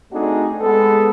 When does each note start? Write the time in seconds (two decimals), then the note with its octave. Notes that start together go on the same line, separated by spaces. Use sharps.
0.12 A3 C4 D4 D#4 F#4 G#4
0.61 G#3 B3 A4